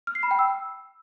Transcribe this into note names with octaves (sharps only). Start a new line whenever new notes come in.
F6
C7
B5
G5
E6